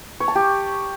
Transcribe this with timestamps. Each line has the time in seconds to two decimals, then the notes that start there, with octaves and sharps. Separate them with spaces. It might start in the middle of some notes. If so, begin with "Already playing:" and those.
0.20 C#5
0.28 A5
0.35 G4